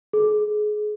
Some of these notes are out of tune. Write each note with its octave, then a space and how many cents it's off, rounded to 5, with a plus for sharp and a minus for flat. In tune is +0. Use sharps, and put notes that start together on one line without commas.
G#4 +25